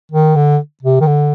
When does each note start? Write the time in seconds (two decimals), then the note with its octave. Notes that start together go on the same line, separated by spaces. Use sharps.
0.12 D#3
0.36 D3
0.83 C3
1.01 D#3
1.07 D3